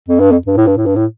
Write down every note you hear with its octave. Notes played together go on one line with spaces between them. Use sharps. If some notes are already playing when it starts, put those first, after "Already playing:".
F2
G2
F2
G2
A2
G2
A2
G2
A2